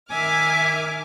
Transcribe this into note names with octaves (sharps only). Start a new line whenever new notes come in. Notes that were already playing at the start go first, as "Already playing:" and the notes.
D#3 E5 G#5 D6 F6